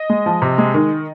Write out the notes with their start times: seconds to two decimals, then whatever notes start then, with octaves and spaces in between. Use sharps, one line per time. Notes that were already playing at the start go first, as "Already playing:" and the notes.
Already playing: D#5
0.10 G#3
0.26 F3
0.42 C3
0.58 G#3
0.74 D#3